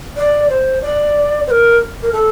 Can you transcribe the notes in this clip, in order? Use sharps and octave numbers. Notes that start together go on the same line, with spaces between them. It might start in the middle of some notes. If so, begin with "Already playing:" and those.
D5
C5
D5
C5
A#4
A#4
A4